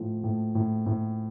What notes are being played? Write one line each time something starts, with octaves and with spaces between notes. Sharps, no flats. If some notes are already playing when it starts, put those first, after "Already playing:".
Already playing: A2 F3
A2
A2
A2